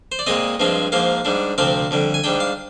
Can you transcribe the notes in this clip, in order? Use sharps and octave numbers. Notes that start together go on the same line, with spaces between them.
C5
D5
A#2 G#3 C4 D#5
G2 F3 G#3 C4
G#2 F3 A#3 F5
G#2 G3 D4
D2 C3 F3 C4 F5
F2 D3 G3
G#5
G#2 G3 D4 G5
F5